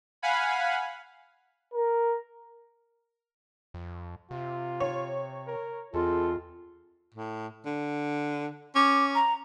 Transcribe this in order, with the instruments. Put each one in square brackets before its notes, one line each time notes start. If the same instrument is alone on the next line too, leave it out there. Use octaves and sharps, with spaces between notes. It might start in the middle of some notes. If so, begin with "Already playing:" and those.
[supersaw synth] F5 F#5 G#5 B5
[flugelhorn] A#4
[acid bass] F2
[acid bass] C3 [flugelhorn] F4
[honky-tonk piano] C#5
[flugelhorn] A#4
[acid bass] E2 [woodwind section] G#3 C4 F4 [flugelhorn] A4
[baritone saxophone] A2
D3
[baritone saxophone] C#4 [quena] D6
[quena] A#5